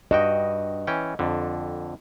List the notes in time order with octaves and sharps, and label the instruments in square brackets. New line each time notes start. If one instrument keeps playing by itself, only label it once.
[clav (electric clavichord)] G2 F#4 G5 [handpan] D#5
[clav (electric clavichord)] E3 C#4 G5
F2 D3